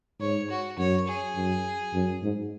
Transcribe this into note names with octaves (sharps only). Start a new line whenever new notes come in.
G#2 C#5
F#4
F#2 C#5
G#4
F#2
F#2
G#2